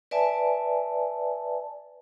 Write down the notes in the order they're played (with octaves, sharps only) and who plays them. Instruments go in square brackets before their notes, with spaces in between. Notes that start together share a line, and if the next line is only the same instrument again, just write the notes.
[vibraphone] B4 D5 E5 G#5 A5